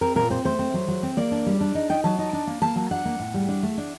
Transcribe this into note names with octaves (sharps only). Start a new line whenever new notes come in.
C4 A#4
A#2 A#4
C4 C5
A3 C5
C4
F#3
F#3
C4
A#3 D5
D4
G3
D4
D#4
D#4 G5
F#3 A5
D#4
D4
A#3
A#3 A5
F#3
D4 F#5
A#3
A2
G3
D4
A3
D4